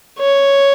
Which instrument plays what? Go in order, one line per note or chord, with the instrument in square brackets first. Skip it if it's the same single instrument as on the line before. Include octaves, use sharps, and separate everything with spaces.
[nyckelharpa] C#5